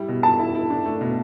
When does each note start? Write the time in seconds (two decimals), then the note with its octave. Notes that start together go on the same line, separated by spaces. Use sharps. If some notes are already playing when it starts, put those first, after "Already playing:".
Already playing: G3 E4
0.09 B2
0.23 B2 A5
0.39 E4
0.55 E4
0.70 D4
0.86 A3
1.01 B2